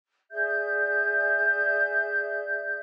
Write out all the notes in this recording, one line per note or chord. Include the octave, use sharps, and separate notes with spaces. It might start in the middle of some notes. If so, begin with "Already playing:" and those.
G#4 D5 E5 G6